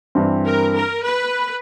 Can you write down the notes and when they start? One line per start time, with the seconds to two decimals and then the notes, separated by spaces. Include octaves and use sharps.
0.15 G2 E3 G3 C4
0.44 A#4
0.74 A#4
1.04 B4